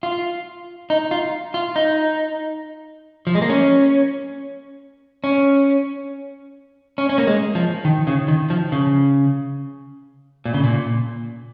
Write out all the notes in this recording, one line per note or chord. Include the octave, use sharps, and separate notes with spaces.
F4
D#4
F4
F4
D#4
F3
G#3
A#3
C#4
C#4
C#4
C#4
A#3
G#3
F3
D#3
C#3
D#3
F3
C#3
A#2
C#3
A#2